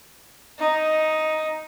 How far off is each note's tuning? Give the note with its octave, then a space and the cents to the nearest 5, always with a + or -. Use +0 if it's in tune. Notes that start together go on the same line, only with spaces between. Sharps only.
D#4 +5